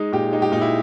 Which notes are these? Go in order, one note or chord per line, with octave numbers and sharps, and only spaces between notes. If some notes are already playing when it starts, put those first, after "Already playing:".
Already playing: G#3 D#4
A#2 G4
G#3 D#4
G4
A#2 D#4
E4